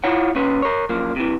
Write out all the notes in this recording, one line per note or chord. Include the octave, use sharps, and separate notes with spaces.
E4 F4 C#5 F#5
D#2 C#4 B4
A#4 C#5
F#2 F3 A#3
C3 E3